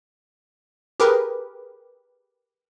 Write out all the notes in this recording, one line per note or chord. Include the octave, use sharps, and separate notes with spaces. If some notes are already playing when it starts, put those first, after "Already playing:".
G4 G#4 A#4 B4